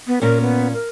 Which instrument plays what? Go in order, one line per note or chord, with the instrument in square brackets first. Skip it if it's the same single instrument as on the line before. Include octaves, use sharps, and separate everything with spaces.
[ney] B3
[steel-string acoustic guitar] A#2 C#4 [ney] A#4
[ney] B3
A#4